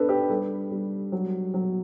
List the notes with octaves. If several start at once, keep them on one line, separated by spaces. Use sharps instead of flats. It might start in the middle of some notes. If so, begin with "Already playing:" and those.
Already playing: B3 D4 A4 B4
G4
G3 A4
G3
F#3
F#3